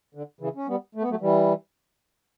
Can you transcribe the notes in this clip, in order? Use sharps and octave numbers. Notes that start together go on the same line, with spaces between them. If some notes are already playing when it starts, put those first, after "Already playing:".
D3
C#3 E3
C#4
G3 B3
A3
B3
F#3 A3
E3 G3